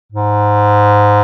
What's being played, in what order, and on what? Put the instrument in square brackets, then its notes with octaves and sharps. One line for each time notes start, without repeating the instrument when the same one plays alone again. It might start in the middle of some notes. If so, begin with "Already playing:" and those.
[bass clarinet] G#2